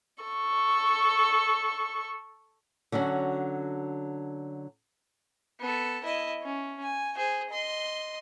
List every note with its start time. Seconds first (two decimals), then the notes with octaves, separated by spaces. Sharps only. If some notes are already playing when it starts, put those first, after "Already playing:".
0.24 A4 C#6
2.92 D3 F#3 C#4 F#4
5.60 B3 A4
6.04 E4 D#5
6.42 C#4
6.83 G#5
7.16 G#4 C5
7.50 D#5 C6